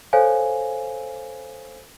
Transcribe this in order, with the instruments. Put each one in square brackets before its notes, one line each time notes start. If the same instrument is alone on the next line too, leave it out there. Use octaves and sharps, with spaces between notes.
[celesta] A4 C5 C#5 F5 G#5